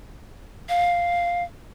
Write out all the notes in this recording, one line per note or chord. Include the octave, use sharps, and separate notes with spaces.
F5